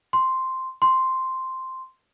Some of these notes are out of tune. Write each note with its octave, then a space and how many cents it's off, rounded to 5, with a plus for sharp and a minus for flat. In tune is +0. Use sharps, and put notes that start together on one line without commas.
C6 -5
C6 -5